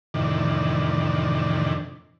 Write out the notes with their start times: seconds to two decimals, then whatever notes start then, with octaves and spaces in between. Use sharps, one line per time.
0.14 F2 A2 C3 D#3 E3 D4